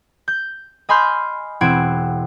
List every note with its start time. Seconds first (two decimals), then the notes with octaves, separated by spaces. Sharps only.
0.28 G6
0.89 D#5 G#5 B5 C6 F6 G6
1.61 E1 C4 E4 F#5 G#6 D7